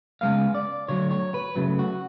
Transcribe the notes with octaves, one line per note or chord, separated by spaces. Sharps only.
C#3 G#3 B3 F5
D5
D3 F#3 A3 C#5
C#5
B4
C#3 F#3 A3
F#4